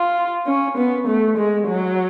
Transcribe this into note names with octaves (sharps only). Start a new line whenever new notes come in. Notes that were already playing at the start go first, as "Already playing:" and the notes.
Already playing: F4
C#4
B3
A3
G#3
F#3